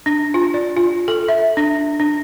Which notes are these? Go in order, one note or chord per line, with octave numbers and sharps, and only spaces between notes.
D4
F4
D5
F4
A4
E5
D4
D4